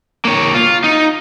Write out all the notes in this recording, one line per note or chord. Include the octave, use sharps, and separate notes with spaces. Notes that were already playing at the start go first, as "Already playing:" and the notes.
A#3 C#5
F4
D#4